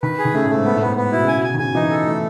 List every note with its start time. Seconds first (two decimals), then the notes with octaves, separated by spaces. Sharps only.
0.03 D#3 B4
0.19 G#4
0.25 D#3
0.34 C#3 A3
0.44 A2
0.50 G#2 A3
0.65 G#2 B3
0.76 A2
0.81 G#2 B3
0.97 B3
1.12 B2 E4
1.23 C#3 G#5
1.35 B2
1.44 G#5
1.54 D#3
1.59 C#3 G#5
1.75 E3 D#4
1.90 A4
2.07 A3